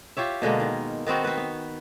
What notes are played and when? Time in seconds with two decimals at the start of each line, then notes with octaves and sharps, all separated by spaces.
0.17 F4 G4 C#5 E5
0.42 B2 D3 G#3 A#3
0.60 D#3
1.06 D#3 B3 C4 F#4
1.24 C4 B4
1.37 B3